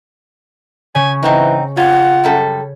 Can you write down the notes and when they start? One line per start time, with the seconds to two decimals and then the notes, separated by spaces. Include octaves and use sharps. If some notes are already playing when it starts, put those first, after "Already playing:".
0.95 C#3 C#4 G#5
1.23 G#2 E3 C4 D#4
1.77 F2 F4 F#5 G#6
2.24 F#2 G3 A4